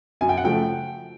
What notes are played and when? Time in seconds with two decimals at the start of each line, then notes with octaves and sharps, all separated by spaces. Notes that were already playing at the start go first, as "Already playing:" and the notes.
0.21 F#2 G#5
0.29 G5
0.37 F#5
0.44 C#3 F3 A3 G5